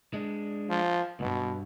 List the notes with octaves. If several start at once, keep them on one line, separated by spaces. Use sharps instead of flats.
G#3 D4
F3
C#2 G2 B2